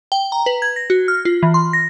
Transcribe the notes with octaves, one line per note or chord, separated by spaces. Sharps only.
G5
A#5
B4
G#6
A#6
F#4
F6
F4
E3
C6
A#6